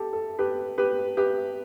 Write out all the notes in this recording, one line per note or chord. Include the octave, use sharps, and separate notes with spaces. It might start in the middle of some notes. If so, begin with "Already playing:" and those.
Already playing: G4 A4
A4
G4 B4
G4 B4
G4 B4